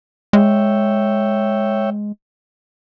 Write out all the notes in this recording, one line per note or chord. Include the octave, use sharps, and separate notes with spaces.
G#3 C#5 E5 G5